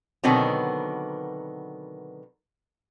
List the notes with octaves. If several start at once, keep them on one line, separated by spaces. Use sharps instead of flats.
B2 D3 D#3 F#3 B3 C4